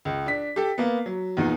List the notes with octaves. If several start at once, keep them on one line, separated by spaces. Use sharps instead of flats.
C#2
D4 B6
G4 A4
A#3 B3
F#3
E2 A#2 D#4